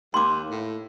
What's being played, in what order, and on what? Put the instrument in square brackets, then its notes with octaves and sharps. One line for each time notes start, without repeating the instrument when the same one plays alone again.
[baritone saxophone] D#2 [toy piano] C6 D6
[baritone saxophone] A2